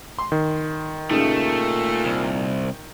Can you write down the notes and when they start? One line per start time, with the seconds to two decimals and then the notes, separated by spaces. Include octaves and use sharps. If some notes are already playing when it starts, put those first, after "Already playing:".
0.19 C6
0.32 D#3
1.10 A#2 C#3 A3 D#4
2.05 C2